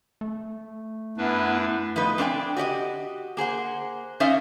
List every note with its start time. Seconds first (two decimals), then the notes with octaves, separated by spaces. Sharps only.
0.21 A3
1.17 F#2 B3 D4 E4 B4
1.96 F3 B3 D#4 B4
2.18 C4 D4 B4 F5 G5 G#5
2.57 F#4 G4 D5 D#5
3.37 A#3 G#4 C5 F#5
4.20 C#4 D#4 C5 D5 E5 F5